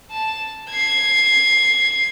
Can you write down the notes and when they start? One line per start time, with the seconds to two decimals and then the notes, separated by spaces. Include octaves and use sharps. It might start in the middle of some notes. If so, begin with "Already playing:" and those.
0.11 A5
0.71 G#6 C7